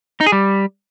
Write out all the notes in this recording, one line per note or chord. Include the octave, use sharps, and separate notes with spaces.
D#4
G#4
G3